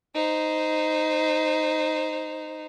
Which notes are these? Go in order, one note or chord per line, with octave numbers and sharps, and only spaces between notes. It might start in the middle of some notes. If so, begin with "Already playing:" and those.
D#4 C5